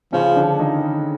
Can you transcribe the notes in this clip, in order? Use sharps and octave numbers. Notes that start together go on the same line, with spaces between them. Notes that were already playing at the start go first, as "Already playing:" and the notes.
C#3 F3 C#4
D3 D4
D#3 D#4